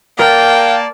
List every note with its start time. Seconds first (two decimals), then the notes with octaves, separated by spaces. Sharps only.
0.19 A#3 A#4 D5 F5 G5 A5